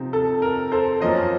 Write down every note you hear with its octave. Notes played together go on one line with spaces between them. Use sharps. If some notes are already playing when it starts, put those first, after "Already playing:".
Already playing: C3 F3 C4 D#4
A4
A#4
A4 C5
F#2 F3 A#3 C#4 C5 D#5